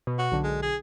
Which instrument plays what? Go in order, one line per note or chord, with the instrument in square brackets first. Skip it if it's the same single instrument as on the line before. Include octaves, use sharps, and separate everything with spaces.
[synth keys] B2
[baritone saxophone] F#4
[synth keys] B1 D3
[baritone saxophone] G#3
G#4